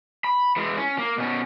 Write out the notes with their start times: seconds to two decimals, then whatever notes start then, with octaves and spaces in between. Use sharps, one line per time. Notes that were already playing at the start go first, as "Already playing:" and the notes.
0.24 B5
0.56 E3 G#3
0.78 C#4
0.98 A#3
1.18 B2 C#4